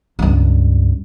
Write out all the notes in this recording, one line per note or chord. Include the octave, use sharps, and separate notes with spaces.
C#2 G2